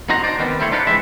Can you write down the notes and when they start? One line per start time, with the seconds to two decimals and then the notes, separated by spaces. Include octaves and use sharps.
0.09 D#4 F#4 C5 A#5
0.24 D4 D#4 C5 D5
0.39 D#3 G3 B3 C4
0.60 G3 A3 E4 C5 C#5
0.72 D4 D#4 F4 G4 B4 F#5
0.87 E3 G#3 C4 E5